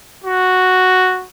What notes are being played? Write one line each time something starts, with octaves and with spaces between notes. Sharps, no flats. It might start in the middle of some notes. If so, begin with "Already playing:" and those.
F#4